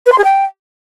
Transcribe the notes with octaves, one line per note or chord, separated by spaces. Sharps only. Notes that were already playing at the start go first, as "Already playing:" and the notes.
B4
C6
G#4
G5